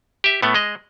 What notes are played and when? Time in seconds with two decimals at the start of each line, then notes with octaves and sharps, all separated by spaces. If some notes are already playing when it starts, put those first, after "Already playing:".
0.24 G4 E5
0.42 A2 A3 B3
0.55 G#3 D#5